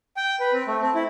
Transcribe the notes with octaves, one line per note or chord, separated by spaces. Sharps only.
G5
B4
C4
A3
C4
E4